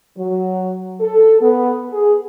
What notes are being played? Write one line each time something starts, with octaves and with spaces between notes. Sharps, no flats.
F#3
A4
B3
G#4